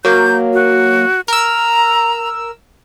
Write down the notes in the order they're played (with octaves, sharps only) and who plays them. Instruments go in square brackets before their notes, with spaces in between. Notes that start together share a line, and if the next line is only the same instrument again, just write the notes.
[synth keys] F#3 A#3 [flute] G6
[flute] F#4
[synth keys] A#4 E6 [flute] A#5